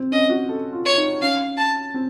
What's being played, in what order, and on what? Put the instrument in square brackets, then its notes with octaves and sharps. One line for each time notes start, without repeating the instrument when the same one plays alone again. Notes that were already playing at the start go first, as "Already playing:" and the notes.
Already playing: [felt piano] C4
[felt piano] C#4 [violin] D#5
[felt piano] F#4
A4
F4
[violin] C#5
[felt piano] D#4
[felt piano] C#4 [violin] F5
[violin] A5
[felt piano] C4